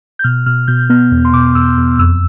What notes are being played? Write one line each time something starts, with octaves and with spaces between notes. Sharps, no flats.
G6
B2 F6
B2 F6
B2 G6
B3 F6
E2
C6
B2 D6
E2 E6
E2
F2 E6